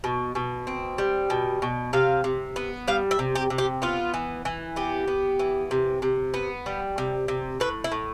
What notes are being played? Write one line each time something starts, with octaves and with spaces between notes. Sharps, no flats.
B2
B2
C4
G3
B2
B2
C3 F5
C3
B3
G3 F5
E5
C3
G4
C3
G4
B3 F4
E3
E3
B3 G4
B3
E3
C3
C3
B3
G3
C3
C3
A2 B4
E4
A2